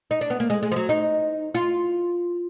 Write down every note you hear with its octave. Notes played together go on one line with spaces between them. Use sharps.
D#4
D4
B3
A#3
G#3
G#3
F3
F#3
D#4
F4